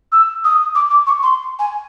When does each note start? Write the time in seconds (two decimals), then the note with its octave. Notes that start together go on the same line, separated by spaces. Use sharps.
0.12 E6
0.44 D#6
0.75 D6
0.91 D6
1.07 C#6
1.23 C6
1.59 G#5